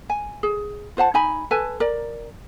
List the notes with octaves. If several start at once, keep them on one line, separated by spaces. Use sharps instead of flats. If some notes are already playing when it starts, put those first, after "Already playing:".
G#5
G#4
F4 C5 F#5 A5
D#4 G#5 B5
A4 B4 G#5 A5
A#4 D5